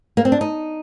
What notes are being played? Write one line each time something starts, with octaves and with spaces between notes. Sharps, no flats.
A#3
C4
D4
D#4